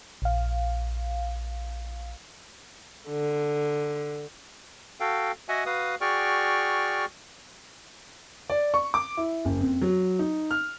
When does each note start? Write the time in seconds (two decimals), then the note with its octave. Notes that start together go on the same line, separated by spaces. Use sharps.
0.22 A#1 F5
3.09 D3
5.00 F#4 A4 F5 G5
5.49 F#4 D#5 E5 F#5 G#5
5.66 F#4 B4 F5 D#6
6.01 F#4 G#4 D5 G5 C#6 F6
8.50 D5
8.74 C#6
8.94 D6
9.17 E4
9.45 F#1
9.60 F2
9.82 F#3
10.19 D#4
10.51 F6